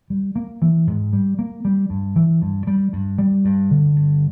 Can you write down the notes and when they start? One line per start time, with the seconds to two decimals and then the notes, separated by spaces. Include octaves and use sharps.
0.10 G3
0.36 A#3
0.62 E3
0.87 G#2
1.13 G3
1.39 A#3
1.65 G3
1.90 G2
2.16 E3
2.42 G2
2.67 G3
2.93 G2
3.18 G3
3.45 G2
3.71 D3
3.96 G2